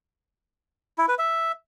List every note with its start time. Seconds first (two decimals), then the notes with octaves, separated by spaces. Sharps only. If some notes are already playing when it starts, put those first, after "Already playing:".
0.98 E4
1.08 B4
1.19 E5